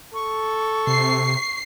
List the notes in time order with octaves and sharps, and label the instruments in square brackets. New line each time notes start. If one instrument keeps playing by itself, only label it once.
[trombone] A4 [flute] C#6
[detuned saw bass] C3 [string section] C7